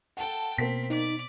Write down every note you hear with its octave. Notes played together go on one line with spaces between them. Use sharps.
A4 F#5 G5 A5
B2 A#3 C4 B6
D#4 D5